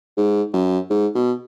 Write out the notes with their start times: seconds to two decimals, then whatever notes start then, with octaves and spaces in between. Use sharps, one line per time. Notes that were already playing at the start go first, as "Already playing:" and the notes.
0.17 G#2
0.53 F#2
0.90 G#2
1.15 B2